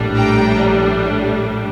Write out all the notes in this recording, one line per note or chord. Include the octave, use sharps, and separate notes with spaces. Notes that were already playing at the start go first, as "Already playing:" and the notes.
Already playing: A#1 A2 G3 D4
G5 A#5